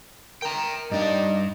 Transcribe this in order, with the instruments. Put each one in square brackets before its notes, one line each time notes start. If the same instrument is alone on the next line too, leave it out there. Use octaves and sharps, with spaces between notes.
[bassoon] A#4 [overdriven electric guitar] G5 A#5
[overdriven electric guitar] G2 D4 [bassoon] D#4